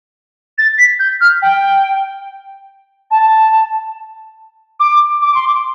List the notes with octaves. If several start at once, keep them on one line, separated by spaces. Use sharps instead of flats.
A6
B6
G6
F6
G5
A5
D6
D6
C6
D6